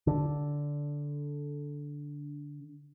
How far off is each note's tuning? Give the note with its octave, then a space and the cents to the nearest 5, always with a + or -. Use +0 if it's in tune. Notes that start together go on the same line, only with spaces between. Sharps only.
D3 -10